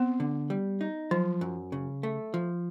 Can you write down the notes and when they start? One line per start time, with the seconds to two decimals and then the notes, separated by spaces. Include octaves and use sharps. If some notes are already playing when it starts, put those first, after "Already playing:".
Already playing: B3 C4
0.20 D3
0.50 G3
0.81 D#4
1.11 F3 F#3
1.41 F#2
1.72 C#3
2.03 A3
2.34 F3